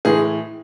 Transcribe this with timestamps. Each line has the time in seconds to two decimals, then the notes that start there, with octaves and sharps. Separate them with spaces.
0.05 A2 E3 G#3 G#4